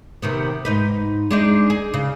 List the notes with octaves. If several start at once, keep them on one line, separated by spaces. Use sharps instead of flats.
C3 D#3 B3
G#2 D#4 B4
G#3 D4 D#4
G#4
C#3